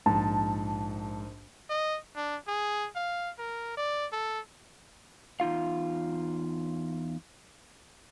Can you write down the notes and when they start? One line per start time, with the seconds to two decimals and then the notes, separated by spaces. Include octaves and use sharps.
0.06 A#1 G#2 A5
1.70 D#5
2.16 D4
2.48 G#4
2.96 F5
3.39 A#4
3.77 D5
4.12 A4
5.40 E2 D#4 F4 F5